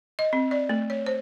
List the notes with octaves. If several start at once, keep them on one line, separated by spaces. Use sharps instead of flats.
D#5
C4
D5
A3
C#5
C5